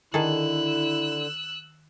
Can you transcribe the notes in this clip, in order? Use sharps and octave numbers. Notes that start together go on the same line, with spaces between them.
D3 D#3 E4 G#4 A4 E6 F#6